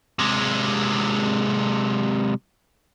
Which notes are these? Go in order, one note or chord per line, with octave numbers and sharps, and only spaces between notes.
C3 G#3